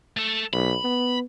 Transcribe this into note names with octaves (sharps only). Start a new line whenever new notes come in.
A3 A4
B1 B5
B3